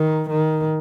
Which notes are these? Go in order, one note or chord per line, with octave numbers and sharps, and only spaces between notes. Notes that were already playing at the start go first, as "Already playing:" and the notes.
Already playing: D#3
D#3